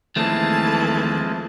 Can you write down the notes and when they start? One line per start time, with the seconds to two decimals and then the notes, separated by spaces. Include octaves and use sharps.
0.16 D#2 E3 F3 G#3 A3 C4 A5